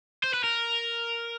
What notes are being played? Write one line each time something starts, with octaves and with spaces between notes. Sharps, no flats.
C5
B4
A#4